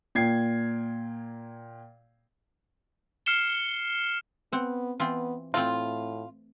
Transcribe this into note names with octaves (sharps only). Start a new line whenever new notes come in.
A#2 G5 G#6 C7
F6 C7 C#7 E7 G7
B3 C4 F#5
E3 B3 C4 F4
A2 A3 C4 F4